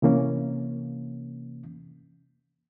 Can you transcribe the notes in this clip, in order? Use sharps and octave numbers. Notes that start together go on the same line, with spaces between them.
C3 E3 A#3 C#4